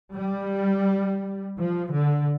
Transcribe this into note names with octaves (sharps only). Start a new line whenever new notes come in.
G3
F3
D3